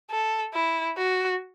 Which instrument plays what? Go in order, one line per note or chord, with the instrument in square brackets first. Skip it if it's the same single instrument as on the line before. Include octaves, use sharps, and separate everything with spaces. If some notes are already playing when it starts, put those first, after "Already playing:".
[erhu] A4
E4
F#4